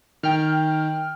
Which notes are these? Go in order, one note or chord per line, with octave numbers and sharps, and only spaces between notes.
D#3 G5 F6